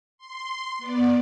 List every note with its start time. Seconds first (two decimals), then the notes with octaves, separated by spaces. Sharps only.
0.18 C6
0.78 B3 D5